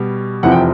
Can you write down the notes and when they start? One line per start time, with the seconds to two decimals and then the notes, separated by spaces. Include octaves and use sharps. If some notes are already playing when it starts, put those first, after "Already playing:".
Already playing: B2 G3
0.43 F1 E2 C3 F3 F#5
0.51 G5